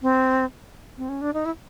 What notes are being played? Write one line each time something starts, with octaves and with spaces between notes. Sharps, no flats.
C4
C4
C#4
D4
D#4
E4